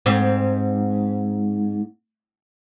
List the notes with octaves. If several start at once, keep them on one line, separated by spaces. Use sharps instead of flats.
G#2 C4